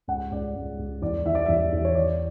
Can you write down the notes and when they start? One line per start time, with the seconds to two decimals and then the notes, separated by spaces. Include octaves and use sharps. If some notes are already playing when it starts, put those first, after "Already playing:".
0.08 C#2 F#5
0.31 C#2 D5
0.55 C#2
0.78 C#2
1.02 E2 D5
1.25 E3 E5
1.35 D5
1.46 E2 E5
1.73 E2
1.85 C#5
1.95 E3 D5